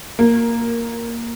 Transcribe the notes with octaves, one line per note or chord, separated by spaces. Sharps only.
A#3